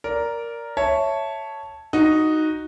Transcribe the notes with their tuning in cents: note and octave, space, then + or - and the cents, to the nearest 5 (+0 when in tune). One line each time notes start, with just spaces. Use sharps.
A#4 +0 D5 -15
C#5 +0 E5 +0 A5 +0
D#4 +0 F#4 +0